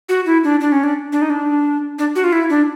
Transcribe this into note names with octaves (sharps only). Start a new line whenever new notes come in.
F#4
E4
D4
D4
C#4
D4
D4
D#4
D4
D4
F#4
F4
E4
D4